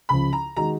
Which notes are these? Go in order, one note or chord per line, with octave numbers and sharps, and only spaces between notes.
C#2 C#3 F3 B5
A#5
D#3 G#3 D#4 F#4 A#5